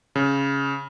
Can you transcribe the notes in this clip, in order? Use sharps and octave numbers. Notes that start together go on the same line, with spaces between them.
C#3